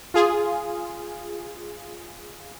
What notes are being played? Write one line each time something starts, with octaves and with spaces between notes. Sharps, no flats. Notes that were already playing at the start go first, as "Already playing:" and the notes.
F4 G#4